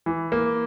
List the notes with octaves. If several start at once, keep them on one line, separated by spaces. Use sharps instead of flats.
E3
A#3